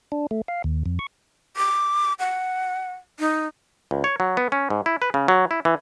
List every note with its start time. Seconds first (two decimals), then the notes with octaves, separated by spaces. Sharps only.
0.12 D4
0.31 A3
0.48 F5
0.64 D#2
0.86 F2
0.99 C#6
1.57 D6
2.20 F#5
3.20 D#4
3.91 C#2
4.04 C#5
4.20 F#3
4.37 B3
4.52 C#4
4.70 G#2
4.86 E4
5.02 B4
5.14 C#3
5.28 F#3
5.51 E4
5.65 E3